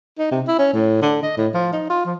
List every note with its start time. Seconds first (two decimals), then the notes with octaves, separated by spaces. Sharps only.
0.18 D#4
0.31 C3
0.47 E4
0.59 C#4
0.73 A2
1.02 D3
1.23 D#5
1.37 A2
1.54 F3
1.73 D#4
1.90 F4
2.06 F3